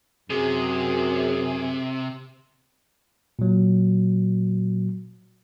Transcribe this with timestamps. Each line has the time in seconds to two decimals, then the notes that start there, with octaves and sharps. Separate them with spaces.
0.30 F#2 C3 G#4
3.39 A#2 F#3